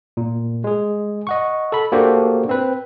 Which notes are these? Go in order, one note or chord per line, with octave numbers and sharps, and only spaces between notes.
A#2
G#3 G#4
D#5 F#5 C#6
A4 B5
A#3 D4 F#4 G4 A4 C5
C4 B4